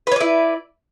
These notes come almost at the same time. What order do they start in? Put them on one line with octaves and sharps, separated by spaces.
B4 C#5 D5 E4